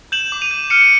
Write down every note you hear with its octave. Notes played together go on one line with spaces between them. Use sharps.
G6 E7 F#7
D6
D#7 F7
G6
F6 C#7 D#7
D#7